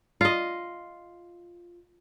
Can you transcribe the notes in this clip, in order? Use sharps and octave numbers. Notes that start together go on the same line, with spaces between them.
F4 D#5